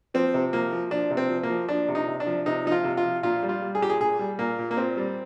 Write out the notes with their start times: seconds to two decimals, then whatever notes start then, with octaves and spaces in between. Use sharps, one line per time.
0.14 F3 C4
0.34 C3
0.53 F3 A#3
0.72 F3
0.91 F3 D4
1.11 C3
1.17 C4
1.30 F3
1.43 A#3
1.50 F3
1.69 F3 D4
1.88 C3
1.95 D#4
2.07 C3
2.20 D4
2.27 F3
2.46 C3 D#4
2.65 F3 D#4
2.72 F4
2.84 C3
2.97 F4
3.04 F3
3.23 A#2 F4
3.43 G3
3.49 F4
3.62 G3
3.75 G#4
3.81 A#2 G4
3.90 G#4
4.01 A#2 G#4
4.19 G3
4.39 A#2 A#3
4.59 A#2
4.71 A#3
4.77 A#2 C4
4.97 G3